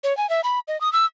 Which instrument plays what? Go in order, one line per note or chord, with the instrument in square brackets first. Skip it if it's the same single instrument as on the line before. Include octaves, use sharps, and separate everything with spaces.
[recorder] C#5
G#5
E5
B5
D#5
D#6
E6